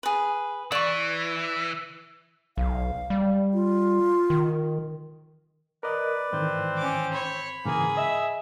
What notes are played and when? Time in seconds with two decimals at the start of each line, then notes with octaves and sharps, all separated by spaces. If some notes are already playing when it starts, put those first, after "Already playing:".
0.03 G#4 B4
0.72 E3 D5 C#6
2.57 B1 F5
3.10 G3
3.54 F4
4.30 D#3
5.83 A#4 B4 D5 D#5
6.33 G#2 D#3 E3 C4
6.77 C#4 D6
7.13 C#5 B5
7.65 G#2 C#3 E3 A#3 G#4
7.97 D#5 E5